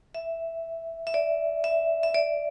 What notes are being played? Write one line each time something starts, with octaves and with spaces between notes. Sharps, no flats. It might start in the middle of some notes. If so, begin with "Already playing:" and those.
E5
E5
D5
E5
E5
D5